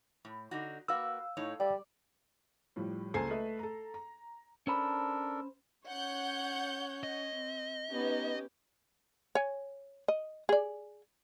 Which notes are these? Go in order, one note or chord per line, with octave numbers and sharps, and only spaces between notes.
A2
D3 D#4 F#4
A#3 F#4 B4 F5 E6
A2 D#4 C#5
G3 D5
A2 F3 G3
C#2 A#3 A4 C5 G#5 C7
A3 A4 B4 D#5 E5
A4 A#5
A#5
C#4 D4 A4 A#4 C5 B5
C#4 C#5 F#5 G6
D#5
C4
B3 C#4 D#4 G4
C#5 G#5
D#5
G#4 D5